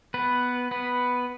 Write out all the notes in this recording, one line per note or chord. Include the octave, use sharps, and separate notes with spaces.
B3 B4
B3 B4